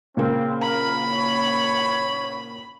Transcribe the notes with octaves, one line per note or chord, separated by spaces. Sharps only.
A#2 C#3 A#3 C4
A#4 B5
C#5